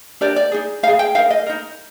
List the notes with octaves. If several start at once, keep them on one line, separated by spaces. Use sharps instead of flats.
D4 G4 A#4 D5
D5
D#4 G#4
D#4 G#4 F5
G5
D#4 A#4 F5
D#5
D#4 A#4